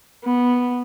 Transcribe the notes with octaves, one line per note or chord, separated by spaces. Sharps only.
B3